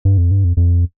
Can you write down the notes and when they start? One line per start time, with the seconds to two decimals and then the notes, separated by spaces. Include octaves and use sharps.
0.05 G2
0.18 F2
0.31 G2
0.44 F2
0.57 F2